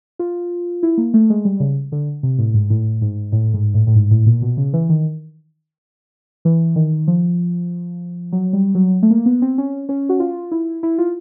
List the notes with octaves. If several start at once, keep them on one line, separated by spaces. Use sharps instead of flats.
F4
E4
A#3
A3
G#3
G3
C#3
D3
C3
A2
G#2
A2
G#2
A2
G#2
A2
A2
G#2
A2
A#2
B2
C#3
E3
D#3
E3
D#3
F3
F#3
G3
F#3
A3
A#3
B3
C4
C#4
C#4
F#4
F4
E4
E4
F4